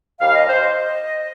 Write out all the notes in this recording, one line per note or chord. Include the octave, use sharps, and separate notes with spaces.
D#2 D#3 G3 F5
D#5
C5
D#5